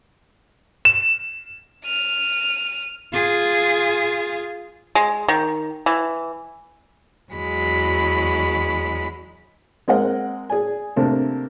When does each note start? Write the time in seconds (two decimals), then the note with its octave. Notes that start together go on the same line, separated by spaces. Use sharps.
0.85 E7
1.85 F6 D#7
3.13 F4 G#4
4.95 G#3
5.28 D#3
5.86 E3
7.33 E2 F#3 G#3 B5
9.88 G#3 C4 A#4 D#5 F#5
10.50 G#4 D5 G#5
10.96 C3 A3 A#3 C4 D4